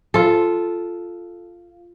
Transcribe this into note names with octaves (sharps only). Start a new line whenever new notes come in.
F4 A4